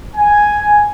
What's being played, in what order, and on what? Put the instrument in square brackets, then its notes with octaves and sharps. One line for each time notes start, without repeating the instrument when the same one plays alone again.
[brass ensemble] G#5